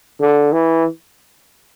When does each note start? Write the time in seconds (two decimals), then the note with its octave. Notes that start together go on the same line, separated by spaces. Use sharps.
0.20 D3
0.52 E3